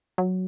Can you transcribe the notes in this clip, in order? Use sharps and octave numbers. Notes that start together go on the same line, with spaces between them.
F#3